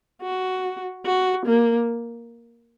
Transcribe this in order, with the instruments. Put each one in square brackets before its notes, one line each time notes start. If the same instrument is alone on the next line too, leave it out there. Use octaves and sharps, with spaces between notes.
[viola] F#4
F#4
A#3